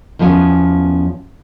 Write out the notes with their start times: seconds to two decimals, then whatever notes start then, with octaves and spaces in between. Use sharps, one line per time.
0.19 E2 F3 B3 C#4 B4 G#5